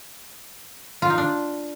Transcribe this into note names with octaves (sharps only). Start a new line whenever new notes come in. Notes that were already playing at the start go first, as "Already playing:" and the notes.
F4
D#4
D4